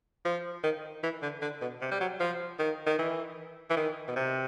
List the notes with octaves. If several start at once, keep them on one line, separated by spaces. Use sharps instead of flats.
F3
D#3
E3
D3
D3
B2
C3
G3
F#3
F3
D#3
D#3
E3
E3
D#3
B2
C3